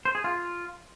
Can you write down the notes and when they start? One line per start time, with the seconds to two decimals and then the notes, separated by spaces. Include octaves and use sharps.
0.05 C5
0.15 G#4
0.24 F4